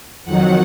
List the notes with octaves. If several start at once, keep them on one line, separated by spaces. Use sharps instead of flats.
F2 D#3 F#3 F#5